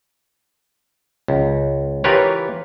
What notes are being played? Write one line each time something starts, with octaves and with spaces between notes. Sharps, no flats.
C#2
E3 F4 G4 A#4 B4 C#5